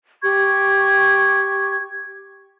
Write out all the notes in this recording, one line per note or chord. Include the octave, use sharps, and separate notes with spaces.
G4 C#6 G#6